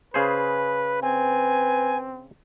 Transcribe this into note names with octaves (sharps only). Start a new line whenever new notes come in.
C#3 G#4 B4 C5
C4 B4 G#5